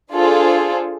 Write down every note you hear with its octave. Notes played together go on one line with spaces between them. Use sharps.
D4 F4 G#4 A4 C5